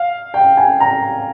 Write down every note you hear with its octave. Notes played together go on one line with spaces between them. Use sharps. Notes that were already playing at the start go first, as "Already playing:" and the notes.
Already playing: F5
G5
G#5
A#5